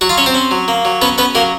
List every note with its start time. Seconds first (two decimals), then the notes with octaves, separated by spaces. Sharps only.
0.01 F#3 F#4 F#5
0.09 F4 F5
0.17 C#4 C#5
0.26 C4 C5
0.35 C#4
0.51 F#3
0.68 A#3
0.85 F#3
1.02 B3 C#4 B4
1.18 B3 C#4 B4
1.35 F#3 A#3 A#4